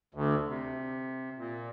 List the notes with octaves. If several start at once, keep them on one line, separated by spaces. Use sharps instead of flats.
D2
C3
A#2